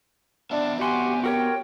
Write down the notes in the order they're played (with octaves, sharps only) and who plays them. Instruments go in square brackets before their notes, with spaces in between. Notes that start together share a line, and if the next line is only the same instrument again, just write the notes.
[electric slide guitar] B3 C4 E5 [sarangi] D4
[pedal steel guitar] F#4 C6 [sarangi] G4 [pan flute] G#5
[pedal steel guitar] F#4 A#4 C#5 [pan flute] G5